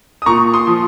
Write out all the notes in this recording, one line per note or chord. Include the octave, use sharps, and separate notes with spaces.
D#6
A#2 A#5 C#6
C6 D#6
F3